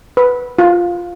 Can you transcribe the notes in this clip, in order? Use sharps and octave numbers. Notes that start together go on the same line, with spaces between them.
B4
F4